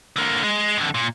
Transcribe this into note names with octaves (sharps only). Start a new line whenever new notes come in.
D3 A#3
G#3
F2 D3
A#2